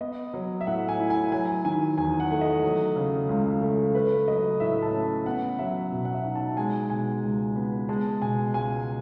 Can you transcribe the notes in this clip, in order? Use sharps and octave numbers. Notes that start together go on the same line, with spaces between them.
B3 D#5
F#3
E5
A2 F#5
G#5
E4
G#5
F#3 G#5
D#3 G#5
E2 G#5
F#5
A3
D#5
F#3
C#3
C#2
A3
A3 B4
F#3 D#5
A2 E5
A5
C#4
B3 F#5
F#3 E5
B2
F#5
E5
D#4
A5
G#3 G#5
B2 G#5
C#2
B3
G#3 A5
B2 G#5
C#2 G#5